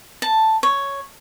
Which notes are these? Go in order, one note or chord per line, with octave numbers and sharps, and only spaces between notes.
A5
C#5